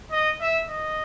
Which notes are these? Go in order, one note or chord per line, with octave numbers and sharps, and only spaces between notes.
D#5
E5
D#5